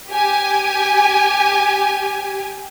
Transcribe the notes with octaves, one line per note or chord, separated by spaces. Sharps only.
G4 G#5